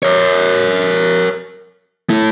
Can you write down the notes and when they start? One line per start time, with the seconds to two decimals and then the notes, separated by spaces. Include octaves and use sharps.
0.03 A#4 C#5
2.10 A3 E4